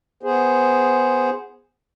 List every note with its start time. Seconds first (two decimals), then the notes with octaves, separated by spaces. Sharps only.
0.23 B3 G#4 C5